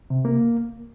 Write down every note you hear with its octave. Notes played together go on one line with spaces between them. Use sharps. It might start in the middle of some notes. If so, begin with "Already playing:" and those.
C3
A#3